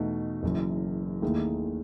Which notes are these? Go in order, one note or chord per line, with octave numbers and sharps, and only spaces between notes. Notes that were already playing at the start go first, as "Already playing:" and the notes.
Already playing: E2 B2 A3 D#4 F#4
F#1 F#2 E3
D#2 D#3 A3 E4 G#4